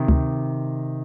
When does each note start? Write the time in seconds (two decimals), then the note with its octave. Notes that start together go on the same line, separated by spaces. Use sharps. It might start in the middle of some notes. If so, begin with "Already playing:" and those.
Already playing: C3 D#3
0.08 D2